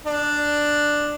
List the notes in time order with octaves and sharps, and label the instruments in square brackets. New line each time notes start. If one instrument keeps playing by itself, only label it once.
[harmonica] D4